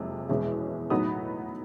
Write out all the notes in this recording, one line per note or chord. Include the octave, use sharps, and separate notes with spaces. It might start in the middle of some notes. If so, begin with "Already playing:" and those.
Already playing: F#1 F2 C3 G#3
E2 B2 G#3 C#4 E4
A2 F#3 B3 D#4 D#6